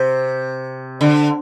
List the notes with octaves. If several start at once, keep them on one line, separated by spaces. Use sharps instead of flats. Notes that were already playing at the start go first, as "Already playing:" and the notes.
Already playing: C3
D3